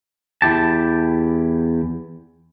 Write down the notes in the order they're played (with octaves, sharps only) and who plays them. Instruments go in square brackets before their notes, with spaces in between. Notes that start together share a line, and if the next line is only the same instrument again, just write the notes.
[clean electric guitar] E2 E4 G4 A5